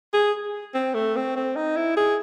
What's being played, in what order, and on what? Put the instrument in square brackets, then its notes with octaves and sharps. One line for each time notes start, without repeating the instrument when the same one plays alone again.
[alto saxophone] G#4
C4
A3
C4
C4
D#4
E4
G#4